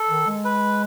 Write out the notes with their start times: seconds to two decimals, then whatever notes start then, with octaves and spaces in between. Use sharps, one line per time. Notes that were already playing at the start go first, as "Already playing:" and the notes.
Already playing: A4
0.08 D#3
0.26 G#3
0.45 B4